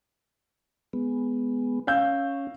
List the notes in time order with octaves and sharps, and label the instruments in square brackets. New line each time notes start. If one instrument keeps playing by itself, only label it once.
[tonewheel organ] G#3 B3
[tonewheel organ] C#4 [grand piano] F5 E6 G6